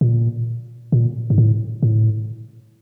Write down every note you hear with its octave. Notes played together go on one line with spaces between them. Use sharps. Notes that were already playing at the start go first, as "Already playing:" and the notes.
A#2
A#2
G#2
A2
A2